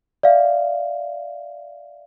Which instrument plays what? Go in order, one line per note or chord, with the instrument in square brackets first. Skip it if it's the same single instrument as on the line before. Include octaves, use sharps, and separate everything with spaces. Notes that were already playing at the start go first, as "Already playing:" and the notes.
[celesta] D5 E5 F5